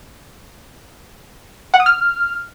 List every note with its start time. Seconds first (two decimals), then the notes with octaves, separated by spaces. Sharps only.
1.74 F#5
1.80 D#6
1.86 F6